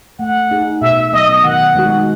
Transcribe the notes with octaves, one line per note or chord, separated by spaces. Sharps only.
A3 F#5
D#4 G#4
B2 E5
F#3 B3 D#5
D#3 F#5
G#3 D#4 F#4